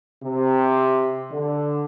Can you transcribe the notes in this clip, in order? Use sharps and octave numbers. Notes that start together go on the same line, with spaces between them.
C3
D3